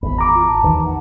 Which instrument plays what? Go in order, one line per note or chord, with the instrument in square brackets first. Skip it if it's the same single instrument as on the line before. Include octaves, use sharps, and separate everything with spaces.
[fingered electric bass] G#1 E2 [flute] B5
[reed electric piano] A#5 D6
[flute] F4
A5
[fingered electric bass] D#2 D#3 E3
[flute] F#5